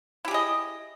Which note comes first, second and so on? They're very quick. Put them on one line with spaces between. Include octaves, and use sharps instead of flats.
E4 G4 G#4 D#5